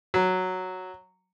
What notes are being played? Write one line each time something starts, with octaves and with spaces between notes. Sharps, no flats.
F#3